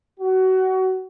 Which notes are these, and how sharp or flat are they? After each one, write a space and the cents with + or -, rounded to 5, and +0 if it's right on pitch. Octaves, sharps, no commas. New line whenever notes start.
F#4 +25